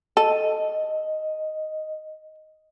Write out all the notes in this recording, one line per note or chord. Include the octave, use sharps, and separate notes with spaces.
A4 D#5